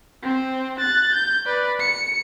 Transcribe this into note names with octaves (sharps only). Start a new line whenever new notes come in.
C4 C5
F#6 A6
G6
B4 D5
C#7